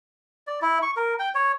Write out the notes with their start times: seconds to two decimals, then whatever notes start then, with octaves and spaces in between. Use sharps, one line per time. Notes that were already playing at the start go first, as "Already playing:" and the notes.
0.47 D5
0.62 E4
0.82 C#6
0.97 A#4
1.19 G5
1.35 C#5